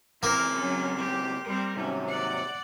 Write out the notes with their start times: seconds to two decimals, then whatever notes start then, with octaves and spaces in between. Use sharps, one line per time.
0.23 C#2 E3 A#3 C4 A#4 C6
0.57 F#3 C#4
0.98 G4
1.47 G3 C4 A#4
1.77 D#2 G#2 C3 F#3 C#4
2.08 D5 F#5